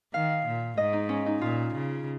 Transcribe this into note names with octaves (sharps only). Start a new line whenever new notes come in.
D#3 F5
A#2
G#2 D#5
D#4
C#4
D#4
A#2 F4
C#3